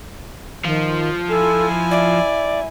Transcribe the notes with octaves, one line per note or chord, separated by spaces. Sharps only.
D#3 F3
E4 A4 G#5
D5 E5